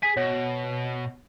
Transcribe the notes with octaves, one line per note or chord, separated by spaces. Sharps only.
G#4 G#5 B6
B2 C#5